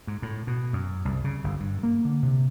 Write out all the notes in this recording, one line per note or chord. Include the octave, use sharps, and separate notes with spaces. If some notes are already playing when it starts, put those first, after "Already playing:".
G#2
A2
B2
F#2
C2
C#3
G1
G2
A#3
D3
C3